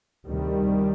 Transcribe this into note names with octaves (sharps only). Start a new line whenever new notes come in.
D2 C3 D#3 G3